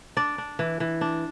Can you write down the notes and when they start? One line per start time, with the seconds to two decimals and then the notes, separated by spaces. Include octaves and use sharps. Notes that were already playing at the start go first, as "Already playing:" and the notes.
0.17 D4 D5
0.38 D4
0.59 E3
0.80 E3
1.01 D4